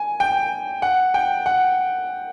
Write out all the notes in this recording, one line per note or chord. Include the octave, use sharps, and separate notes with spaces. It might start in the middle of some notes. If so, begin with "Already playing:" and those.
Already playing: G#5
G5
F#5
G5
F#5